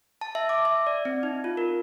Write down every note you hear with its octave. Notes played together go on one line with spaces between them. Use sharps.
A5
E5
D6
E5
D5
C4
D#4
F4
A#4